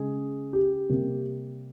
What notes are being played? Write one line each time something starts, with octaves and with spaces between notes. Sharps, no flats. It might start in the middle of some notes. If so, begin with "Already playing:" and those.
Already playing: C#3 G#3 C#4 G#4
G4
C3 G3 A#3